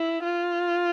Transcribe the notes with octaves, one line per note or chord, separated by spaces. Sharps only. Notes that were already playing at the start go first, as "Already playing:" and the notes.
Already playing: E4
F4